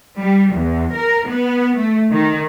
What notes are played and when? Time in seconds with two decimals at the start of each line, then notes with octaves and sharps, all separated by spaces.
0.20 G3
0.55 E2
0.95 A#4
1.30 B3
1.77 A3
2.11 D#3